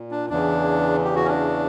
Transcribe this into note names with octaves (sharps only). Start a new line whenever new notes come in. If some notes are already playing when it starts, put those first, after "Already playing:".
Already playing: A#2
D4
E2 C#3 E3 D4
G4
F#4
C#4
D4